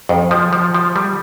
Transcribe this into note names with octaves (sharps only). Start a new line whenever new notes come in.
F2
F3
F3
F3
G3